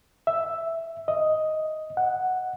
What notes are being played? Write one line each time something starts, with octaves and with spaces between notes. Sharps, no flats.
E5
D#5
F#5